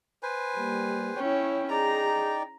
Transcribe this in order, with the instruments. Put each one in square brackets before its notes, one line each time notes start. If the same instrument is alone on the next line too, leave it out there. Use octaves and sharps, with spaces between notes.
[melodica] B4 C5 G#5
[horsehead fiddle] G3 A#3
[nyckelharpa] C#4 E4 [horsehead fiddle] C#5 G5
[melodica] D#4 D5 G5 [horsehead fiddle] G#4 [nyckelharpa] A#5